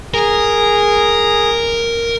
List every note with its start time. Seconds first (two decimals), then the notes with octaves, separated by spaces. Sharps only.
0.14 G#4 A#4